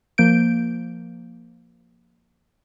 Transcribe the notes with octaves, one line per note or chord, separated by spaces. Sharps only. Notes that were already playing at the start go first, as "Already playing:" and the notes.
F3 A#3 G6 D7